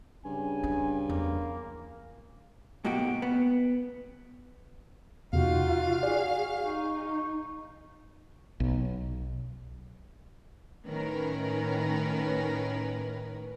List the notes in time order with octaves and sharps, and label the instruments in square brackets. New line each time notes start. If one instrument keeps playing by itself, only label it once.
[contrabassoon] G2 [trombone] C#3 [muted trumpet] G#5
[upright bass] D4
[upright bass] E2 [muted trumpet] A#3
[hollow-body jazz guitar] G#2 B2 A#3 F#4 G4
B3
[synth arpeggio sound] E2 C3 [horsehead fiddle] D#4 F4 [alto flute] F#4 [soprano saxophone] F5
[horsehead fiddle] G#4 [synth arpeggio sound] D5
[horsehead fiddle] D#4 [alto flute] C#6
[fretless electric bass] B1
[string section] A2 D#3 C#4 A#4 B4